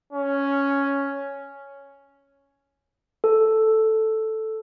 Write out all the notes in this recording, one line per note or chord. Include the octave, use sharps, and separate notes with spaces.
C#4
A4